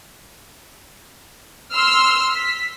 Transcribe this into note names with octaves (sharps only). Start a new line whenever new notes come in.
C6 E6 F6
B6